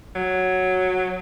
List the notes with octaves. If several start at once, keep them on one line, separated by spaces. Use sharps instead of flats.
F#3